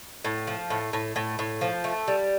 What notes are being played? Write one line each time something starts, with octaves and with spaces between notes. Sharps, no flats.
A2
F3
A2
A2
A2
A2
F3
A3
G3